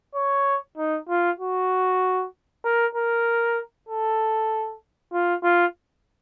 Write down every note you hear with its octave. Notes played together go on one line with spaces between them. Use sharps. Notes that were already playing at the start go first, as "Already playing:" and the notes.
C#5
D#4
F4
F#4
A#4
A#4
A4
F4
F4